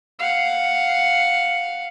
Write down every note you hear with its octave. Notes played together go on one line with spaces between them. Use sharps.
F5 F#5